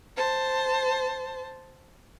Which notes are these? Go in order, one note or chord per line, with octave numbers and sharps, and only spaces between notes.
C5 A5